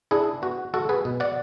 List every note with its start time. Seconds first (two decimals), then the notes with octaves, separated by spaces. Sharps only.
0.11 D4 E4 G#4
0.42 B3 F#4
0.74 G#3 F#4 A4
0.89 G#4 B4
1.05 B2
1.20 D5 F#5